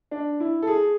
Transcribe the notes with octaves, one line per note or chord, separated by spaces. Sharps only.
D4
E4
A4
G#4